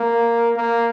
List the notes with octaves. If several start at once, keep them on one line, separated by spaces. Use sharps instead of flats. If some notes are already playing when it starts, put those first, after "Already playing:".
Already playing: A#3
A#3